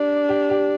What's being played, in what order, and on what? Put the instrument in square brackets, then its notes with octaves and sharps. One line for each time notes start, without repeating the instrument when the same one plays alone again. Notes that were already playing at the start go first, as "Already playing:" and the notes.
Already playing: [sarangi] D4 [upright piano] G4
[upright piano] G4
G4